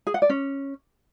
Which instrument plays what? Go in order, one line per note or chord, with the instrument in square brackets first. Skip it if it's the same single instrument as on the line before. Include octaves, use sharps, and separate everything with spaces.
[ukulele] G#4
F#5
D5
C#4